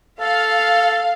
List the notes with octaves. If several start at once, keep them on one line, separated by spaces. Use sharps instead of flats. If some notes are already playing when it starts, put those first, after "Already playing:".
A4 F5